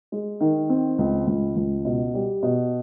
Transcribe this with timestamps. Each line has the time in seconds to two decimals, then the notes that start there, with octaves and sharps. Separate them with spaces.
0.12 G#3
0.41 D#3
0.69 C4
0.98 C#2
1.27 C#2
1.56 C#2
1.85 B2
2.14 G3
2.43 B2